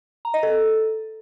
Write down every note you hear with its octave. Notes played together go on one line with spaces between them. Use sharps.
A#5
D#5
A4